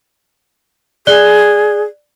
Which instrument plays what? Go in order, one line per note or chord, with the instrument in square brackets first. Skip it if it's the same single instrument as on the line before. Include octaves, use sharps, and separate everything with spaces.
[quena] G#4 [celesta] D5 F#6 G7